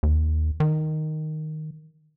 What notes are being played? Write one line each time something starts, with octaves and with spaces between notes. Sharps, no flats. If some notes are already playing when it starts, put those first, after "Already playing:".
D#2
D#3